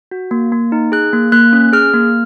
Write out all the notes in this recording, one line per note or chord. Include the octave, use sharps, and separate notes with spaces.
F#4
A#3
A#3
D#4
G#4 F#6
A#3
A#3 F#6
C#4
G#4 F6
A#3